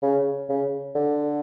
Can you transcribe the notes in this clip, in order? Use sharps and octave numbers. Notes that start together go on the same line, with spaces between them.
C#3
C#3
D3